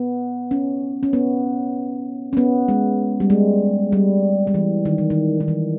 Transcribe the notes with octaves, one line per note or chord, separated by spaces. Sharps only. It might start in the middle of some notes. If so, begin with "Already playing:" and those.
Already playing: B3
C#4
C#4
B3
C#4
B3
G#3
G3
G#3
G3
G3
E3
D#3
E3
D#3
D#3
E3